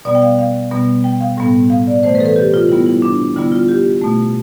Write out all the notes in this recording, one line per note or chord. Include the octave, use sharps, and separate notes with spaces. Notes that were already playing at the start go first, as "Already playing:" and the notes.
B2 G3 B3 D5
G5
F5
F5
B2 G3 B3
G5
F5
A2 G3 B3
F5
D5
C3 E3 A3 C5
B4
A4
B4
G4
F4
C3 G3 B3 E4
E4
D4
D3 G3 B3 E4
F4
G4
B2 A3